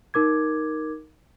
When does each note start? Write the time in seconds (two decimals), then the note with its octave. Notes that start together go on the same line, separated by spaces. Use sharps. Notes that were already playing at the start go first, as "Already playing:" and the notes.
0.14 D#4 A#4 D6 G#6